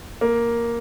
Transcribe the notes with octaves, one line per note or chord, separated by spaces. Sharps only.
A#3